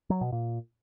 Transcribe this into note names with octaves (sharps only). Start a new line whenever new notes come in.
F#3
B2
A#2